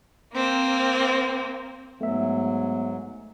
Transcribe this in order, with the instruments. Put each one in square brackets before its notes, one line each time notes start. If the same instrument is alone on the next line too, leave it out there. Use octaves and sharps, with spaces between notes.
[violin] A#3 C4
[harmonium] G#2 F#3 [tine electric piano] A3 B3 E5